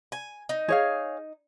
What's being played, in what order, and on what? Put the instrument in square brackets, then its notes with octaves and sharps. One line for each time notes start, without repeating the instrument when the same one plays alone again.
[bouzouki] G#5
D#4
[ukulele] G#4 C#5 F5